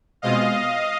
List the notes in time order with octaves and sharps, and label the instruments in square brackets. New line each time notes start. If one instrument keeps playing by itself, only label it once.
[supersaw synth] B2 G#3 C4 F4 D#5 F5